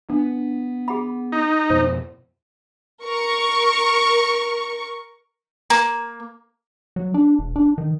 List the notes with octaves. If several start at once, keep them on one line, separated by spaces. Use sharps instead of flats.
B3 D4
G#4 F#5 B5
D#4
F2 B2 C5
A#4 C#6
A#3
F#3
D4
E1
D4
D#3